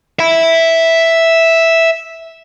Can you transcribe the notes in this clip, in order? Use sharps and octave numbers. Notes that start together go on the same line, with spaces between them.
E5 B5